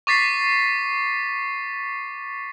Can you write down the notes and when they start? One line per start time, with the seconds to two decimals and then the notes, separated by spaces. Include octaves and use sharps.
0.07 C#6 D6 A6 B6 C7